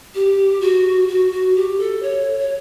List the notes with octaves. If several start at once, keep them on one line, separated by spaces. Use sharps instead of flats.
G4
F#4
F#4
F#4
G4
A4
C#5
C#5